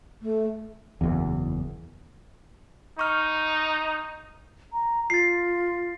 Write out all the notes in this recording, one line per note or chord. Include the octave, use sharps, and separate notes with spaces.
A3
F#1 E2
D#4 C#6 F6
A#5
F4 A6 C7